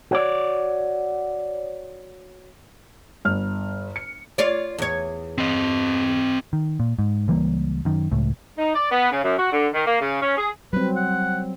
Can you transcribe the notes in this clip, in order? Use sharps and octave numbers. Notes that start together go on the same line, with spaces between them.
F#4 C#5 D5
G1 F6
C#7
F4 C#5 D5
E2 C#5
C4 D#5
D#3
A#2
G#2
C#2 E3 G3 A#3
F#2 D#3
C#2 A2
D#4
D5
B3
C#3
F#2
F#4
D3
D#3
A#3
C#3
C#4
G#4
F#3 G3 C4 B4
F#5